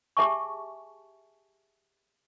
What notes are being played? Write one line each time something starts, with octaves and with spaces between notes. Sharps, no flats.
G4 G#4 E5 G#5 A5 C#6